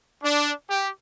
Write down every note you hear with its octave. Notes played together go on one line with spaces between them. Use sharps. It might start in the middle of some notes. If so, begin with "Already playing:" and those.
D4
G4